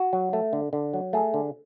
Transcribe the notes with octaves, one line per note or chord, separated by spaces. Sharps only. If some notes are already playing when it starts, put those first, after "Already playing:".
Already playing: F#4
F#3
A3
D3
D3
F#3
A3 G#4
D3